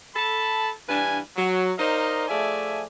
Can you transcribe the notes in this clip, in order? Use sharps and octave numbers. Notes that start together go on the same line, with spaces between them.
A4 A5 B5
G2 E3 D4 B4 G#5
F#3
D#4 A#4 C5 D5 D#5 F5
F3 A3 G#4 D5 E5 G#5